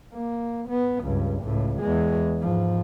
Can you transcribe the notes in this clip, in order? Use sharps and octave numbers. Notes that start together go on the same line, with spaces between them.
A#3
B3
C#2 G2
C#2 A2
E2 G#3
G#2 F3